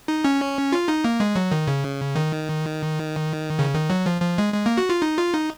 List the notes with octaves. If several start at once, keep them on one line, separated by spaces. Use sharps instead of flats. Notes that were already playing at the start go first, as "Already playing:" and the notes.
D#4
C#4
F4
D#4
A#3
G#3
F#3
D#3
C#3
D#3
C#3
D#3
F#3
F3
F3
G#3
G#3
A#3
F#4
F4
D#4
F4
D#4